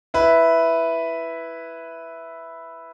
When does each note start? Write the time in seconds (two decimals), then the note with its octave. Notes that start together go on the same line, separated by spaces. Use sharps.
0.14 E4 B4